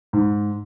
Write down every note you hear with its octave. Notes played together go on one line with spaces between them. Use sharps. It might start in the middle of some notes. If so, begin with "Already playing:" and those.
G#2